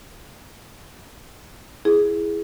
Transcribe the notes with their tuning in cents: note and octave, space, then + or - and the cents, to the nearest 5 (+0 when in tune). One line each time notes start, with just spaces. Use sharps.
E4 +10 G#4 +0